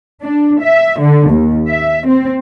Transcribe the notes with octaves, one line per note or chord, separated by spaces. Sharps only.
D4
E5
D3
D#2
E5
C4